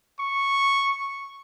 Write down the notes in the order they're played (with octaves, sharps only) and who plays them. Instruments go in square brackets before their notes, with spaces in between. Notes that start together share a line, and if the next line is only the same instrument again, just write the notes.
[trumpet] C#6